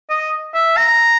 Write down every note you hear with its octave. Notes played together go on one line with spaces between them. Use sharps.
D#5
E5
A#5